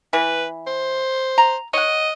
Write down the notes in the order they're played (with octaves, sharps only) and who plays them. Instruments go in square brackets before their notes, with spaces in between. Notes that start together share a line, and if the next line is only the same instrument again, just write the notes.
[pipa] E3 [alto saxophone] B4
[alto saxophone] C5
[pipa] A#5
[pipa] C#5 F#5 [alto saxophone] D#5